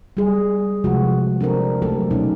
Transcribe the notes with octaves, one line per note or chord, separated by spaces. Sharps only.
G3 G#4
C3 F3 G#3 F#4
C4 D4 A4 A#4
F#3 A3 G4 A4
B2 C#4 D#4